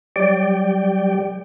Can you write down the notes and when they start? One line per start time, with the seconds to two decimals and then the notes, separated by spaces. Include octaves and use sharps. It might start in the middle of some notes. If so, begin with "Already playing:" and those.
0.16 F#3 G3 G4 D5 G5